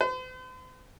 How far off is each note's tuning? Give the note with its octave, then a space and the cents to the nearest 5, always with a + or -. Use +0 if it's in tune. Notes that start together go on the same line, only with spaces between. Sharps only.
C5 -45